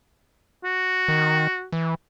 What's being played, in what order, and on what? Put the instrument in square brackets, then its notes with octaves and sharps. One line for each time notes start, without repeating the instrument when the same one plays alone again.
[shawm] F#4
[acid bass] D#3
E3